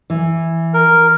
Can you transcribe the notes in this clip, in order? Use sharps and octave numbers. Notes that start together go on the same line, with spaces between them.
E3
A#4